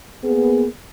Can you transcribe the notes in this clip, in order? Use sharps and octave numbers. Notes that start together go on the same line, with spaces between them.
A#3 B3 G#4